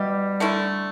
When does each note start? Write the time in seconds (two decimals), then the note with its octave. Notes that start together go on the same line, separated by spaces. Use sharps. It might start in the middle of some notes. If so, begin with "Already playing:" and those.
Already playing: B2 G3 E4 G4
0.40 D3 A3 E4